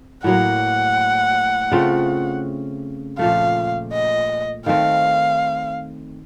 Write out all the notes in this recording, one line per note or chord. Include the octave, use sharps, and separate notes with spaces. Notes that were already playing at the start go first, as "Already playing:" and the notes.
Already playing: C4
A2 F#3 A#3 F#5
C#3 A3 C4 F4
A#2 F3 A3 F5
D#5
D#3 A3 C4 F5